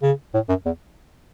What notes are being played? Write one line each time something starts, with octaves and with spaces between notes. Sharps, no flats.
C#3
A2
F#2
E2